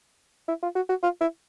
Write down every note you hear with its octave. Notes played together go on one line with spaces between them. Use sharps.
E4
F4
F#4
F#4
F4
E4